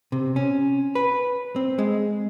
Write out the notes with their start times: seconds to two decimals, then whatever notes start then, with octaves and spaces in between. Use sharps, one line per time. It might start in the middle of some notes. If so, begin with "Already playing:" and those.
0.12 C3
0.36 C#4
0.95 B4
1.56 C4
1.79 G#3